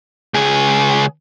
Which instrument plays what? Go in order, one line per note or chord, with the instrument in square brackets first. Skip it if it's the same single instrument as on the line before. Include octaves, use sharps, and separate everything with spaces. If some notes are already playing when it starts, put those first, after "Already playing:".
[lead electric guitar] C#2 G#4